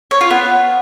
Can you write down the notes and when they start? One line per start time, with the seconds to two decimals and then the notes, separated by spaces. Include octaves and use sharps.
0.11 C#5
0.21 F4
0.31 B3